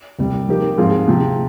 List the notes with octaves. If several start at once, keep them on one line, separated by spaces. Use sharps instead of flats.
C2 C3 G3
F3 A#3 D#4 G4
G#2 F3 C4 F4 G#4
C3 F3 C4